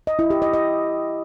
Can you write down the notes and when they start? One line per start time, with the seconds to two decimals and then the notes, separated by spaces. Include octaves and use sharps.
0.07 D#5
0.19 E4
0.30 G4
0.42 D#5
0.53 D#5